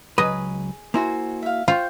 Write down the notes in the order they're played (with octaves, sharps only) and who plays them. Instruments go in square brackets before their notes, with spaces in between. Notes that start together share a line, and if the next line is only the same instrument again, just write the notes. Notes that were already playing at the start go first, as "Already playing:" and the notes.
[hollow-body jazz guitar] C#2 F#3 B4 [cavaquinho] G#4 [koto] D#5
[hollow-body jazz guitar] A#3 E4 F#4 [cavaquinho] C5 G#5
[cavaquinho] E5 F5
[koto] F4 [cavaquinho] C5 G5 C#6